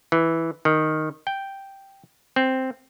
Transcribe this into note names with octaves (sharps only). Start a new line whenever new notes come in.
E3
D#3
G5
C4